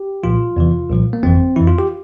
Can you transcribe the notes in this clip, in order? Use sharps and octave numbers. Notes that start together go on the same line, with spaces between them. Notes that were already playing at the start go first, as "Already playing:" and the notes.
Already playing: G4
C2 A#2 F3 F4
E2 C3 E3
C2 A#2 F3
A#3
G1 F2 E3 C4
F2 E3 E4
F4
G4